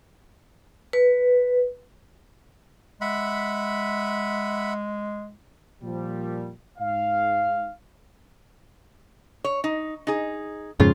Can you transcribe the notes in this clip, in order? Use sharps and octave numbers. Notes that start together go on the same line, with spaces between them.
B4
G#3 E5 F#5 B5
A#2 F3 G3
G#2 F5
C#5
D#4
D#4 G#4
F2 G#2 C#3 F4